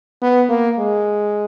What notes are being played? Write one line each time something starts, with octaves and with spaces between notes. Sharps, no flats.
B3
A#3
G#3